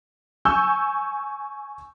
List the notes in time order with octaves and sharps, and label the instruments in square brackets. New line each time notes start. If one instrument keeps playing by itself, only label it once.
[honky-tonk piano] G#5 C#6 E6 G6